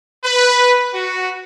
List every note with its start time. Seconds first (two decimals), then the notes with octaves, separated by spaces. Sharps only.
0.24 B4
0.94 F#4